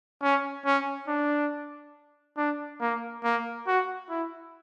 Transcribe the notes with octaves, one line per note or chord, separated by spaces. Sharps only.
C#4
C#4
D4
D4
A#3
A#3
F#4
E4